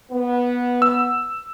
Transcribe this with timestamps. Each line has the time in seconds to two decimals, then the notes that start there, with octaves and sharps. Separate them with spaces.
0.12 B3
0.82 E6